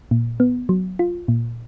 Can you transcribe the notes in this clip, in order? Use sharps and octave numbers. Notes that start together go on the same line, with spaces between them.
A#2
B3
F#3
F4
A#2